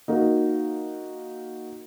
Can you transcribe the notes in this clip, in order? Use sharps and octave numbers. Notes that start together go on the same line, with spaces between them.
A#3 D#4 F#4 A#4